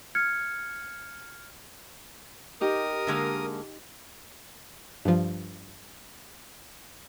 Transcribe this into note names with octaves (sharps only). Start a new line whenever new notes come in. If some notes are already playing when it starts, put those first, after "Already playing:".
F6 G#6 C#7
D#4 G4 A#4 D#6
D3 G#3 A#3
G2 F3